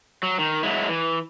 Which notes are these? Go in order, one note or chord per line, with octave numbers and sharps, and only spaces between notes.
F#3
D#3
F#3 G#3 E4
E3